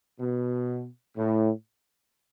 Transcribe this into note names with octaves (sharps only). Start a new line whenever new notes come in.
B2
A2